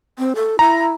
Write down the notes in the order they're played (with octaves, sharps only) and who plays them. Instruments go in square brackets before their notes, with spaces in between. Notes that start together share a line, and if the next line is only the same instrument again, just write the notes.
[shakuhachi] C4
A4
[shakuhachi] E4 [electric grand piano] A#5